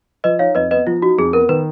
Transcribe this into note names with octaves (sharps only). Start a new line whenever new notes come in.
F3 B4 D#5
D#4 C#5 F5
F2 B4 D#5
B3 B4 D#5
F3 F4
D#4 F#4
F2 G#4
B3 A#4
D#3 B4